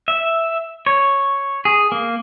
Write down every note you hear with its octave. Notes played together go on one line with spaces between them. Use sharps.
E5
C#5
G#4
A#3